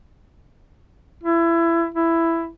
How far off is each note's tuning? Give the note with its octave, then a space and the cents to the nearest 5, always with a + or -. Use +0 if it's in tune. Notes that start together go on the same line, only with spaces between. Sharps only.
E4 +25
E4 +10